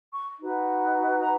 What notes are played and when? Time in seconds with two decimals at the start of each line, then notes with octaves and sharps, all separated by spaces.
0.12 C#6
0.39 D#4 F#4 B4
1.21 A#5